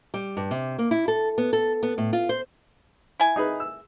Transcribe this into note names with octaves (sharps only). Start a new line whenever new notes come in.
G3
G2
C3
A#3
E4
A4
B3
A4
B3
A2
F4
C5
E4 G#5
D#4 G#4 B4
E6